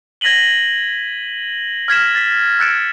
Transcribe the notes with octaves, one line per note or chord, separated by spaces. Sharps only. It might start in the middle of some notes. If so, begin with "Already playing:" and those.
G#6 A#6 B6 D#7 F#7 G7
F6 G#6 B6 E7
A6 B6
E6 F#6 A6 C#7 D7 E7